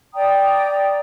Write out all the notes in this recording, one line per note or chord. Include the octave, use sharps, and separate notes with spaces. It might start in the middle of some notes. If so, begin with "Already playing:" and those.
D5 G5 A#5 D#6